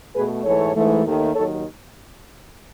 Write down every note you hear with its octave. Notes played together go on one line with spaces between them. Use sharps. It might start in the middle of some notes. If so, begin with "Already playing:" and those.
B2 A3 G#4 B4
G#2 E3 A3 A4 C#5
G#2 E3 A3
D#2 D#3 A3
D#2 D#3 F#3 A4 C#5